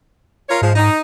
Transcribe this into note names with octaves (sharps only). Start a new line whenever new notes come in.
F4 A#4 C#5
G#2 F3 G#3
D#4